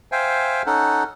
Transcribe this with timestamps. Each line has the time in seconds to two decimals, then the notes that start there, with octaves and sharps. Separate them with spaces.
0.12 C5 E5 F5 G5 G#5
0.66 C#4 D#4 A4 F#5